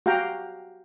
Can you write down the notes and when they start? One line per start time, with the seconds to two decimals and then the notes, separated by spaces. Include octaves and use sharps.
0.06 F#4 G4 F5 G5 A#5